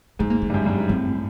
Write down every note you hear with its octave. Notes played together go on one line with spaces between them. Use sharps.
G#2 B3
A#3
B3
G2
F#2
G2
G#2
A2 C4